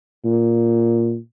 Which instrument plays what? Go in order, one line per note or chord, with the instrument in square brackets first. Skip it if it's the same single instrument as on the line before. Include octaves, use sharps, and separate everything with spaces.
[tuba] A#2